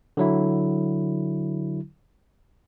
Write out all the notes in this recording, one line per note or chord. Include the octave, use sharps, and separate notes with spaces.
D3 F#3 E4